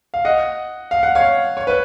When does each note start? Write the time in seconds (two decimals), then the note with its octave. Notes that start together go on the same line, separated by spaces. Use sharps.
0.14 F5
0.25 D#5 F#5
0.91 F5
1.03 F#5
1.15 C#5 F5
1.57 C#5
1.67 B4